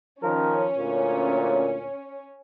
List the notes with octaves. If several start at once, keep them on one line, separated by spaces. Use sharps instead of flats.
D#3 F3 C#4 A#4
D2 A#2